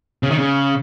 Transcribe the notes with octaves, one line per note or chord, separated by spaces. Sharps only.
C#3
D#3
C#3